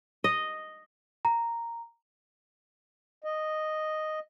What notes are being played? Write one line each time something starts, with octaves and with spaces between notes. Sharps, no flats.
D#5
A#5
D#5